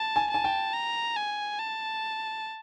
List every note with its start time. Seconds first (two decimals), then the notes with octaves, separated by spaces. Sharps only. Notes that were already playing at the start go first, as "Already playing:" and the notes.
Already playing: A5
0.16 G#5
0.30 G#5 A5
0.44 G5
0.73 A#5
1.16 G#5
1.59 A5